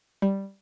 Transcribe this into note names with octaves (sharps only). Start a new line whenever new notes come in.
G3